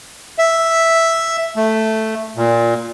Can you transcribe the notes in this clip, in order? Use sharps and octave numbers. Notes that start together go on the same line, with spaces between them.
E5
A3
A#2